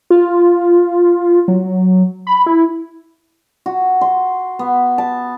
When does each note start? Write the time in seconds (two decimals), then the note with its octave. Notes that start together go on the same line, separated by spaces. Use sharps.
0.10 F4
1.48 F#3
2.27 B5
2.46 E4
3.66 F#4
4.01 C6
4.59 B3
4.98 A5